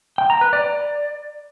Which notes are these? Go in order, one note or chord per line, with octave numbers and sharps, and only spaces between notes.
G5
A#5
B4
D5